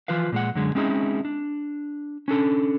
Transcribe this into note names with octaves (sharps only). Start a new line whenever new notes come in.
E3 F3 F4 B4 F5
A#2 G#3 F#5
F#2 D3 G#3
G#3 C4 C#4 D#4 E4 G#4
D4
C#4 D4 A4